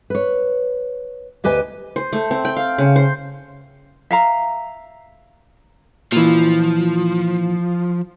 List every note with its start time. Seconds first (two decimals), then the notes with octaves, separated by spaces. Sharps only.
0.10 B4 C#5
1.44 D2 G4 B4 D#5 G#5
1.96 C5
2.13 A3
2.31 C4
2.45 G5
2.56 F5
2.78 C#3
2.96 C5
4.11 E5 F5 A#5
6.12 A#2 E3 F3